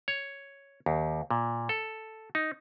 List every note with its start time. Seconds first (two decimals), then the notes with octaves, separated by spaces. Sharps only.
0.08 C#5
0.86 D#2
1.31 A#2
1.69 A4
2.35 D#4